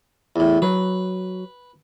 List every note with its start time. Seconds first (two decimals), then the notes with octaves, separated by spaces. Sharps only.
0.36 E2 A2
0.62 F#3 B4